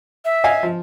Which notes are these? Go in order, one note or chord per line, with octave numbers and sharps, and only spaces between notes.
E5
D#5 F5 G#5
F3